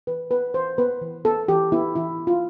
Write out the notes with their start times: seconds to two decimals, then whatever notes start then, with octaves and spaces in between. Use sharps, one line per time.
0.07 E3 B4
0.31 B3 B4
0.54 E3 C5
0.78 B3 B4
1.02 E3
1.25 B3 A4
1.48 E3 G4
1.72 B3 E4
1.96 E3 E4
2.19 B3
2.27 F4